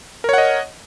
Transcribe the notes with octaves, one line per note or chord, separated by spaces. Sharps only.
A#4 C#5 D#5 F#5